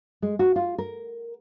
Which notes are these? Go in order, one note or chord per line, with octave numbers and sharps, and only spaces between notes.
G#3
F#4
F4
A#4